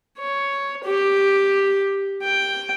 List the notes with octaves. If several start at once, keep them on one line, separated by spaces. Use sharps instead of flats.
C#5
G4
G5